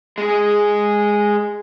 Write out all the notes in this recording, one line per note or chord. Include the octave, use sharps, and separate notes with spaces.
G#3 G#4